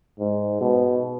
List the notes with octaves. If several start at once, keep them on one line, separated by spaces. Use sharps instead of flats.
G#2
B2